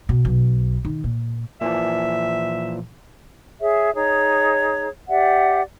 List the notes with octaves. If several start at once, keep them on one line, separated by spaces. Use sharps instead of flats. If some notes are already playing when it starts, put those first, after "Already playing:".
B2
B1
D#3
A#2
A#2 E3 F3 E5
G#4 C#5 E5
D#4 G#4 C#5
G4 D5 E5 F#5